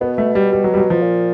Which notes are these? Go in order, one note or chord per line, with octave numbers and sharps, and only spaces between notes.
B2 B3
A3
G3
G3
F#3
G3
F#3
F3
A#2